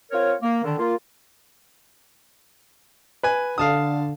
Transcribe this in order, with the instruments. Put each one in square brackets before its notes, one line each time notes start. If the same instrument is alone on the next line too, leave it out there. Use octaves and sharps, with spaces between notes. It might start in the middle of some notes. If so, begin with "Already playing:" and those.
[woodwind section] C4 F4 A#4 C#5
A#3
D3 D#3
A#3 F4
[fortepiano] B4 G#5
[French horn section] D3 [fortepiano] F5 A5 D#6